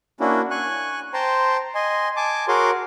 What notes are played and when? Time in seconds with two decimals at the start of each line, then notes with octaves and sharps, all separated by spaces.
0.20 A#3 C#4 D4 E4 F#4
0.51 G#5 C#6 F#6
1.14 C5 G5 A5 A#5 C6
1.75 D#5 G#5 C6
2.16 G#5 A5 D6
2.48 F#4 G#4 A#4 C#5 C6 D6